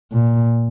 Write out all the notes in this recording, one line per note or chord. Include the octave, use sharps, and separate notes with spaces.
A#2